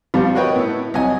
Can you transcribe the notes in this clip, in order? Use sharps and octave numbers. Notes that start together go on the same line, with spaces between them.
G2 F3 G3 B3 F4
F#4 A#4 B4 C#5 D#5 G5
A2 B3 E4
C2 F#3 D#5 G#5